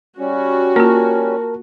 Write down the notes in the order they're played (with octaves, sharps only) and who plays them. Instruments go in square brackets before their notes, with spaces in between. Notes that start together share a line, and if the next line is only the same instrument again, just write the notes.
[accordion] G3 C#4 [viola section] F#4
[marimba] A#3 F4 [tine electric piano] A#4 A5